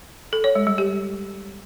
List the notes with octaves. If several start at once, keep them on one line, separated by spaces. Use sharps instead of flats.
A4
C#5
G#3
G3
G4